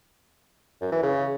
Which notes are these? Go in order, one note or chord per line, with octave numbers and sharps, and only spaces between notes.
F#2
E3
C#3